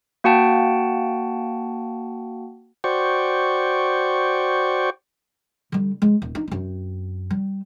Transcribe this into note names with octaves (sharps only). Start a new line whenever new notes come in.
A#3 F#4 F#5 G5 A5
F#4 C5 D5 G5 C#6
D3 G3
G#3
D#1
D#4
F#2 C4
G3